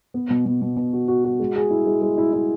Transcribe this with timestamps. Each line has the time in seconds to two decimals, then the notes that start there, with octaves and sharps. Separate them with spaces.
0.14 B3
0.30 B2
0.45 B2
0.62 B2
0.77 B2
0.93 F#4
1.08 F#4
1.25 F#4
1.39 G#3
1.56 G#4
1.71 E4
1.86 G#3
2.02 G#3
2.18 E4
2.33 E4